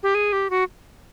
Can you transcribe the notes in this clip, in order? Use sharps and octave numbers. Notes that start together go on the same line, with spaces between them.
G4
G#4
G4
F#4